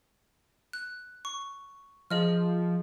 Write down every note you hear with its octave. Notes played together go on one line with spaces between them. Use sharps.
F#6
C#6
F3 G#4 D#5 F6